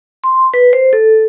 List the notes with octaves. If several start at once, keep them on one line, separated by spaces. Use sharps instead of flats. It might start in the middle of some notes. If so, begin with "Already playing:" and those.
C6
B4
C5
A4